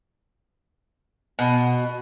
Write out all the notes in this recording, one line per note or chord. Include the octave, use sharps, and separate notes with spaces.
B2